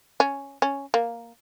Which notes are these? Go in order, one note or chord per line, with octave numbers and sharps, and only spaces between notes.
C#4
C#4
A#3